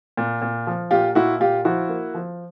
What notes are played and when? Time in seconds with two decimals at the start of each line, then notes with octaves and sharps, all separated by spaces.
0.17 A#2
0.42 A#2
0.67 F3
0.91 A#2 F4 G4
1.15 A#2 E4 F#4
1.40 A#2 F4 G4
1.65 F3 E4 F#4
1.89 A#3
2.14 F3